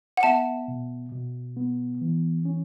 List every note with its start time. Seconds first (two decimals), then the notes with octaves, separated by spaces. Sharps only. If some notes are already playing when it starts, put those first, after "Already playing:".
0.17 F#5
0.23 B3 E5 A5
0.68 B2
1.12 B2
1.57 B3
2.01 E3
2.45 C#4